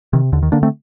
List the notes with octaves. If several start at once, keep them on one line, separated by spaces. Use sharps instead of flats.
C3 D#3
D#2 D3
D#3
D3 A#3 D4
A3 C4